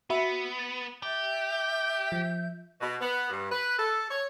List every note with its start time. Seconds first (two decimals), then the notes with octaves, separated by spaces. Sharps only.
0.10 B3 F#4 E5 B5
0.59 A6
1.03 G4 E5 G6
2.12 F3
2.80 B2
3.01 B3
3.30 G2
3.51 B4
3.78 A4
4.10 C#5